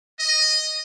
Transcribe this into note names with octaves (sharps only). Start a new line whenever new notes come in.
D#5